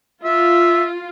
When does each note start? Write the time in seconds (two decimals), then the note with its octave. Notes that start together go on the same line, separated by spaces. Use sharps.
0.24 F4 E5